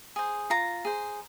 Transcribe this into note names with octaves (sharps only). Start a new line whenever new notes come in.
G#4 C5
F4 A#5
G#4 C5